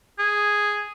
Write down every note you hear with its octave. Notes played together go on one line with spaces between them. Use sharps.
G#4